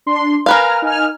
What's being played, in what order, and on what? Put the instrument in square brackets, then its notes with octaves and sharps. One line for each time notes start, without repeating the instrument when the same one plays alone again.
[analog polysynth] D4 C6
[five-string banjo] A#4 B4 F5 [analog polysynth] G#5 A#5 F6
[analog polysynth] D#4 G#5 F6